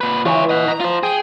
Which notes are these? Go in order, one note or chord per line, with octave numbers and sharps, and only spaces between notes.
A#2 B4
E3 F4 C#5
D#5 F#5
A#5
F4 C5
G#4 G5